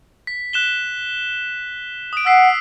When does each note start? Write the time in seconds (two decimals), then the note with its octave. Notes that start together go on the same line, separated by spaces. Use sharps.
0.27 B6
0.53 F#6 E7 G7
2.13 D#6 D7
2.26 F#5 E6 B6 C7